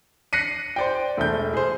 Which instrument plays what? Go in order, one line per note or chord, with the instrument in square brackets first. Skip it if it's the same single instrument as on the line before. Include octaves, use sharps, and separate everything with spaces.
[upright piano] F#6 A#6 C7 C#7 D#7
C5 D5 G5
E1 A3 G6
G#4 C5